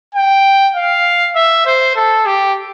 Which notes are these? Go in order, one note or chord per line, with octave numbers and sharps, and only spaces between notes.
G5
F5
E5
C5
A4
G4